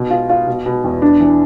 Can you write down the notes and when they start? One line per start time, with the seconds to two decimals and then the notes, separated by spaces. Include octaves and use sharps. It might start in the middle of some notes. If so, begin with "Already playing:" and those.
Already playing: B2
0.10 F4
0.29 F4
0.47 B2
0.66 B2
0.84 E2
1.02 D4
1.20 E3